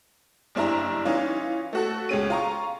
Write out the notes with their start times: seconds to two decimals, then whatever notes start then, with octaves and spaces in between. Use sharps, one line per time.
0.55 F#1 G2 D4 E4 A#5
1.05 E3 C#4 D#4 F4
1.73 A3 F#4 A4
2.09 C#2 G#3 C#4 D#7
2.30 F4 A#5 C#6